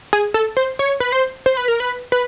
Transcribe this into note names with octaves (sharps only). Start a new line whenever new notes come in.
G#4
A4
C5
C#5
B4
C5
C5
B4
A#4
B4
B4